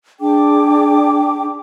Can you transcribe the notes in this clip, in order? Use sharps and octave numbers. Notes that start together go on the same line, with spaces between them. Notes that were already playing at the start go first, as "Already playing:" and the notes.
D4 G#4 G5 D6